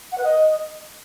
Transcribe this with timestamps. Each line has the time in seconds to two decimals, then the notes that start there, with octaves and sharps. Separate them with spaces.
0.12 F#5
0.18 B4
0.24 D#5